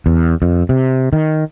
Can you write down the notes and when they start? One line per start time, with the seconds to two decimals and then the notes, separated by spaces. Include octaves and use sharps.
0.06 E2
0.42 F2
0.69 C3
1.13 D#3